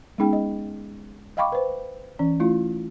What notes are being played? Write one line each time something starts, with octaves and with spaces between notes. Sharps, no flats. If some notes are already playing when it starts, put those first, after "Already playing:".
G#3 B3 C#4 D#4 G#4 G5
D#5
D#5 F5 G5 B5 C#6 D6
B4 C5
E3 C#4 D5
A3 E4 F4